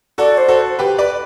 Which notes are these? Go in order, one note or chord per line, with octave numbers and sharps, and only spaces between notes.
F#4 A4 D5
C5
F#4 A4
G4 B4
B4 D5